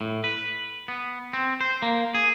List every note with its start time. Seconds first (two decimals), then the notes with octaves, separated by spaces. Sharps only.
0.01 A2
0.24 B4
0.88 B3
1.33 C4
1.61 C5
1.82 A#3
2.15 G#4